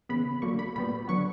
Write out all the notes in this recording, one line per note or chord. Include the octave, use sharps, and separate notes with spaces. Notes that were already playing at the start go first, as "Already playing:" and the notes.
C#3 E3 B3 B5
D3 F#3 A#3 C#6
B5
A#2 G3 B3 B5
D3 F#3 B3 C#6